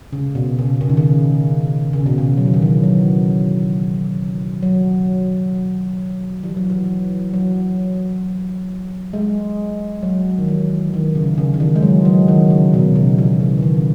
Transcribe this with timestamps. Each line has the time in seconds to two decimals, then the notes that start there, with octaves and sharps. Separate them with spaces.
0.13 C#3
0.35 B2
0.59 C#3
0.81 C#3
0.89 D#3
0.97 C#3
1.93 C#3
2.06 B2
2.18 C#3
2.38 F#3
2.46 E3
2.54 D#3
2.62 E3
2.84 F#3
4.63 F#3
6.43 E3
6.57 F#3
6.70 E3
7.34 F#3
9.13 G#3
10.03 F#3
10.39 D#3
10.48 E3
10.94 D#3
11.15 C#3
11.38 C#3
11.54 D#3
11.60 E3
11.76 G#3
11.83 F#3
12.05 F#3
12.28 D#3
12.50 C#3
12.74 B2
12.95 C#3
13.18 E3
13.40 C#3
13.58 D#3
13.63 C#3